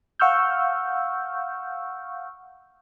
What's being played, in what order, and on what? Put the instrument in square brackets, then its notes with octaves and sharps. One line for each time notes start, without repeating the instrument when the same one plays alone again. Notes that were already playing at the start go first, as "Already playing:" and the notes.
[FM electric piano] F5 F#5 C#6 E6 F6 G6